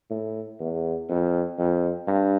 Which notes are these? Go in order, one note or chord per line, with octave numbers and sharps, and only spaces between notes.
A2
E2
F2
F2
G2